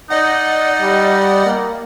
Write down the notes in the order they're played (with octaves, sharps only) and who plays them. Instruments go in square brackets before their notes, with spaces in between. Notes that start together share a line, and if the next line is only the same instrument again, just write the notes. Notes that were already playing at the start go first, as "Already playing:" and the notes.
[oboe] D#4 [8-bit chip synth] D5 D#5 F#5
[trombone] G3
A#3